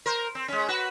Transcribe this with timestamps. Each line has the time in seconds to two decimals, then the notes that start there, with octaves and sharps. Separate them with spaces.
0.06 A#4 C5
0.35 C4
0.48 G#3 C#4
0.68 F#4 B4